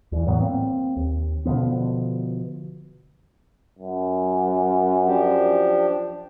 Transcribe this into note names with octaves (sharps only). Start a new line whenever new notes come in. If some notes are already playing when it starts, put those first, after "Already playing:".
E2 E3
A2 E3 F#3 B3
A#3 C4
D#2
B2 D3 F3 B3
F#2
F3 D4 G4